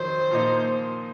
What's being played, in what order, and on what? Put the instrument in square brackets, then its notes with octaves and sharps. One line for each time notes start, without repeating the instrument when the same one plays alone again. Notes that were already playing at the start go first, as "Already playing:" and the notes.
Already playing: [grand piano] F2 D#3 F#3 [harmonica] C5
[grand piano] A#2 F3 A#3 D#4